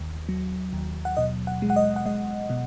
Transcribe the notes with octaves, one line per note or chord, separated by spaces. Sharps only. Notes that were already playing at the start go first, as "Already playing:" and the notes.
Already playing: D#2
F#3
D#2
F#5
B2 D#5
F#5
G#3
F#5
D#5
F#5
G#3 D#5
B2